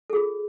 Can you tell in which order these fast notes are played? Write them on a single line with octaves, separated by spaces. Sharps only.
A4 G#4 F4